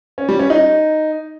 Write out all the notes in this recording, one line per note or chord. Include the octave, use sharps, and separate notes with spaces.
C#4
G3
C#4
D#4